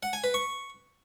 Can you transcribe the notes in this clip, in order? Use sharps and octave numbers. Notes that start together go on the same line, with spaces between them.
F#5
G#5
B4
C#6